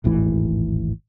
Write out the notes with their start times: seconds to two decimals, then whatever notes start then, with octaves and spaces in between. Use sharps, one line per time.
0.04 D#1 G#1 A2 E3